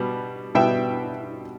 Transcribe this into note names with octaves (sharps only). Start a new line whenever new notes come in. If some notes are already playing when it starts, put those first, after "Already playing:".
Already playing: B2 G3 B3
B2 G3 B3 E5 G5